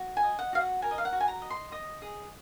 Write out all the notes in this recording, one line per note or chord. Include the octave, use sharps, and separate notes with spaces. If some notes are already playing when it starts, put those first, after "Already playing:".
Already playing: F#4
G#5
D#5
F#5
F#4 F5
F#5
A#4 G#5
D#5
F5
F#5
F#4
G#5
A#5
D#5
C6
D#5 D#6
G#4